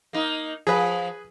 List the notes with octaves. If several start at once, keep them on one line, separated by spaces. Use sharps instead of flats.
A#3 D#4
F3 G#4 B4